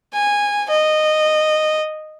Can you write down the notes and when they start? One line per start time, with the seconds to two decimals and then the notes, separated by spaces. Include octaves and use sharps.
0.14 G#5
0.71 D#5